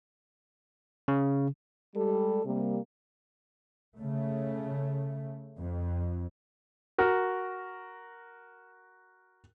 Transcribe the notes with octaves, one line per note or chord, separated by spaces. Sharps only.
C#3
G3 G#3 A4
C3 G3 A#3
C#3 A3
F2
F#4 A#4